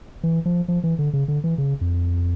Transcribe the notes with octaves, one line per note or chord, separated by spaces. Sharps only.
E3
F3
F3
E3
D3
C#3
D3
E3
C#3
F2